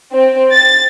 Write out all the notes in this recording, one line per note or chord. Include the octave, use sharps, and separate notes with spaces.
C4
A6